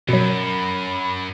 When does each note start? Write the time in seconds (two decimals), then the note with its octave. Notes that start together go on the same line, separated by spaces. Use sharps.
0.09 F#2 B2 F#3 B5